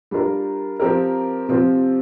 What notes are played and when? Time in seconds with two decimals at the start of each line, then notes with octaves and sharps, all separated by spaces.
0.11 G3 D4 F4 A#4
0.80 F3 C4 G4 A#4
1.49 C3 F3 C4 F4